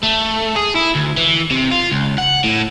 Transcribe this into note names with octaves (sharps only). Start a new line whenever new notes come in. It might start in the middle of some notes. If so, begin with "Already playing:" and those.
A3
G#4
E4
D2
E3
C3
F4
C#2
F#5
A2